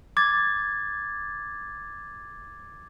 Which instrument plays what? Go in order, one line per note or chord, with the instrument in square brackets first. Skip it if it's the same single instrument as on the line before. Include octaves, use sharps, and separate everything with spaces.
[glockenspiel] D6 G#6 A6